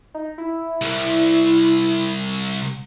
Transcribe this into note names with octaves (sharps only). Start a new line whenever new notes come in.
D#4
E4
C2